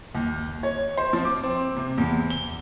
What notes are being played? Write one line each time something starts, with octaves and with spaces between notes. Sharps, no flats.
D#2
C#5
C5
F3
D6
C4
C3
E2
G7